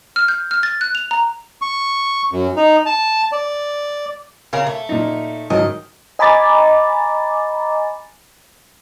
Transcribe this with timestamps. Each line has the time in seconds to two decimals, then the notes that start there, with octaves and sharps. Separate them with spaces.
0.16 F6
0.28 G6
0.51 F6
0.63 A6
0.81 F#6
0.95 F7
1.11 A#5
1.62 C#6
2.32 F#2
2.57 D#4
2.86 A5
3.32 D5
4.53 C#3 A#4 F5
4.66 A3
4.89 A#2 D#4
5.50 G#2 D#3 F#3 D#5
6.19 D#5 G#5 A#5 B5 D6 A6